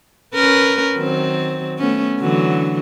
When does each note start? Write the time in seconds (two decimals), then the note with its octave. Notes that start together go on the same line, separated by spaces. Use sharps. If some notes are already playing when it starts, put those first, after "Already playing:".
0.34 C#4 A#4 B4
0.96 D#3 F#3 C4
1.79 A3 B3 C#4
2.20 D3 E3 F#3